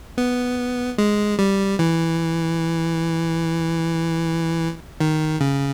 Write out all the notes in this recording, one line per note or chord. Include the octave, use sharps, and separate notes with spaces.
B3
G#3
G3
E3
D#3
C#3